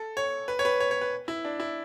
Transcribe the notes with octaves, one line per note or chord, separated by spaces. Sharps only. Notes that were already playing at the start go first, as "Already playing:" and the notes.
Already playing: A4
C#5
B4
C#5
B4
C#5
C#5
B4
E4
D4
E4